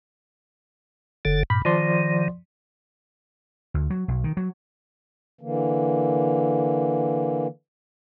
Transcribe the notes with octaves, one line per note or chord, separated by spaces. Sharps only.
F#1 D3 A4
G2 A#2 B5
D#3 F3 D5 C6
D2
F#3
B1
D#3
F#3
D3 E3 A#3